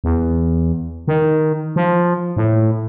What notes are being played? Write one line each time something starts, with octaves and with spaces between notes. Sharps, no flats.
E2
D#3
F3
A2